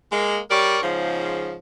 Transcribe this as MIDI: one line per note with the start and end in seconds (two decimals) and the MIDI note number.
0.12 0.40 56
0.12 0.40 58
0.50 0.80 55
0.50 0.80 70
0.50 0.80 73
0.50 0.80 74
0.83 1.56 44
0.83 1.56 49
0.83 1.56 53